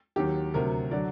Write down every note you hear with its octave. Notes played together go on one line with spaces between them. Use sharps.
D#2 D#3 F#3 G4
D2 C3 F#3 A#4
D3 F#3 D5